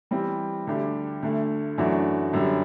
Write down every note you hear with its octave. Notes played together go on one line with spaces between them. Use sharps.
E3 G3 C4
D2 D3 G3 D4 G4
D2 D3 A3
F#2 E3 A3 D4 F#4
F#2 D3 G3